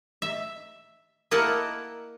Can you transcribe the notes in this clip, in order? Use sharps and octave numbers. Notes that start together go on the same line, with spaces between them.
E5
A#3 E4 A#4 D#5 F#5 A5